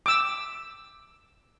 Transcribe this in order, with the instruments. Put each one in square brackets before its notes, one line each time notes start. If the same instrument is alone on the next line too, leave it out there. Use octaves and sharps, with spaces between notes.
[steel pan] D6 E6